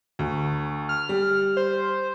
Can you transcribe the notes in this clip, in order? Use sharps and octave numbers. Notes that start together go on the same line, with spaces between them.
D2
F6
G3
C5